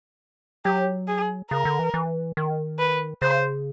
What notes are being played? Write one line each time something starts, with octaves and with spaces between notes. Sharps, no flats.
F#3 G4
G#4
C#3 A#4
D3
E3
E3
D#3
B4
C#3 C5